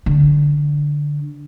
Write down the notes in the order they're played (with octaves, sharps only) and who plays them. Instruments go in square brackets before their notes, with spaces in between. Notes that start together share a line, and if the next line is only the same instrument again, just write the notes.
[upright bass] D3